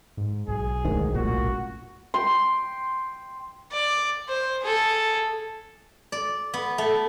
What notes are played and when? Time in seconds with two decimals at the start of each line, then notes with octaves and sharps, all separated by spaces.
0.17 G#2
0.48 B1 G#4
0.85 D2 G#2 D#3
1.14 E1 A1 A#2 F#4
2.14 G5 C6
3.71 D5
4.29 C5
4.63 G#4 A4
6.12 D5
6.54 B3
6.78 A3